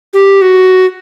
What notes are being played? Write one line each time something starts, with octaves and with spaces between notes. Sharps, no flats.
G4
F#4